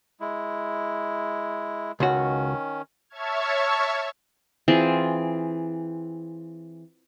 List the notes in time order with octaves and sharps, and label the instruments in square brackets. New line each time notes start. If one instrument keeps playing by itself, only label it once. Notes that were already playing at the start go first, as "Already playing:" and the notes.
[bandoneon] G#3 E4
[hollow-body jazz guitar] C#2 F#4 [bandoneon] D#3 C#4
[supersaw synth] C#5 E5 A5 C#6 F6 G#6
[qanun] E3 C4 F4 G#4